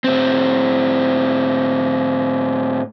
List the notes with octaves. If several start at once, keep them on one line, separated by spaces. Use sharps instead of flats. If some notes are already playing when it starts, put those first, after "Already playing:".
A2 C4